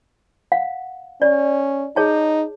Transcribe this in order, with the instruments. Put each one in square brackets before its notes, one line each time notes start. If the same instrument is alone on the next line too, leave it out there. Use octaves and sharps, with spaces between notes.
[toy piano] F5 F#5
[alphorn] C#4 [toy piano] D5
[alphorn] D#4 [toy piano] G#4 C#5 A5